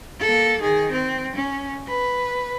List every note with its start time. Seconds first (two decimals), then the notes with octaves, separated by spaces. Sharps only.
0.21 A#3 A4
0.60 D#3 G#4
0.92 C4
1.36 C#4
1.88 B4